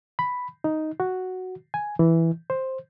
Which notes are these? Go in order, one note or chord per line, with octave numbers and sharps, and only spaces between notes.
B5
D#4
F#4
G#5
E3
C5